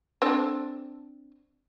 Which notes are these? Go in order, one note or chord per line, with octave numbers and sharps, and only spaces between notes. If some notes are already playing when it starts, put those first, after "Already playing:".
C4 D4 A4